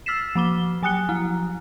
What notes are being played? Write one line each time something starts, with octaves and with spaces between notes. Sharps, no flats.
E6 F6 A6 B6 C7 E7
F3 A#3 D6 G7
F#3 G#5 D#6 F#6 C#7 G7
F3 E4 A#5